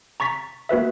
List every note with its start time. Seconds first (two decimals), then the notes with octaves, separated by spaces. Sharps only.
0.20 A#5 C#6 A6 B6
0.69 A#3 F#4 B4 E5